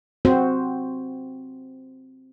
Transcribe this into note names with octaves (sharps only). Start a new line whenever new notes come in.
C4 F#4 C5